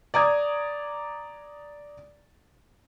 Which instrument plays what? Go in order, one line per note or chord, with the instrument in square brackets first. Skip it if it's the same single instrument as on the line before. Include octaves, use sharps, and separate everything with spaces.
[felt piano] D5 A#5 D#6 G#6